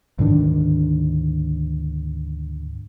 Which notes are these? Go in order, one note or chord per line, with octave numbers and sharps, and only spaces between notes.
D2 G#2 D#3 D4